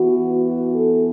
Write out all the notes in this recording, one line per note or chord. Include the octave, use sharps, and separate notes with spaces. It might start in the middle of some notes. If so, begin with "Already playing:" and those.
Already playing: E3 B3 F#4
F#4
A4